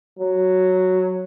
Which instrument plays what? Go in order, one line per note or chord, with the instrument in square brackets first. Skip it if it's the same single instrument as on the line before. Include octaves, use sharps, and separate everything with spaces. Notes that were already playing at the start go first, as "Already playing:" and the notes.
[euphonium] F#3